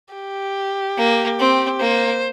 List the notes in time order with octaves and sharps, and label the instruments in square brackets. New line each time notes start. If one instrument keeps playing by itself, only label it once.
[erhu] G4
[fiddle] A#3
C4
[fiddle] A#3 [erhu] C5